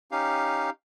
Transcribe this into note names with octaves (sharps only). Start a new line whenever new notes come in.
C#4 D#4 G4 F5